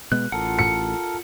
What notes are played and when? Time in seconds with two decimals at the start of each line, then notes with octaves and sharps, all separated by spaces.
0.12 B2 G#3 B3 F#6
0.32 A1 F4 A4 A#4 F#5
0.59 C#7